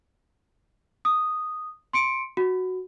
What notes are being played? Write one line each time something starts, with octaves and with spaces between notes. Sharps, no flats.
D#6
C6 C#7 D7
F#4